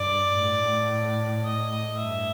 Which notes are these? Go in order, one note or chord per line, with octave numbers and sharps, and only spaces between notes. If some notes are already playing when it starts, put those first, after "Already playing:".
Already playing: G2 D5
A2
D#5
G2 E5